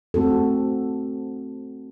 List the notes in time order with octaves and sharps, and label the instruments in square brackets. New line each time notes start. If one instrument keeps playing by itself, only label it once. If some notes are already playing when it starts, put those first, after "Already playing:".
[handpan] A3 C4 F#4 A4